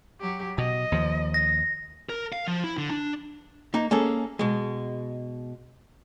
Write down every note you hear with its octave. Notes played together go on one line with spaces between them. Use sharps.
F#3 G4
B2 D#5
D#2 F3
A#6
A#4
F5
F3
E4
D3
D4
A#3 D#4
A#3 C#4 G#4 A4
B2 G#3